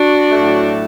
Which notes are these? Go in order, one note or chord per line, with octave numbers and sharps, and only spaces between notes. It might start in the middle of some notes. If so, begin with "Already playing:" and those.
Already playing: D4 F#4
A2 F#3 A3